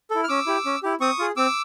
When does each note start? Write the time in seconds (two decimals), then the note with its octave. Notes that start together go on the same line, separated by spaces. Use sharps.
0.11 E4 A4
0.24 F6
0.28 C#4 D6 E6
0.47 E4 G4
0.65 C#4
0.83 E4 G4
1.00 C4 C#6 D#6
1.19 F4 G#4
1.37 C4 D6 E6